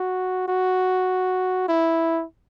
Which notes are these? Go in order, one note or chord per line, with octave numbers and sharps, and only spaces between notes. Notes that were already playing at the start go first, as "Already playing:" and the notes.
Already playing: F#4
F#4
E4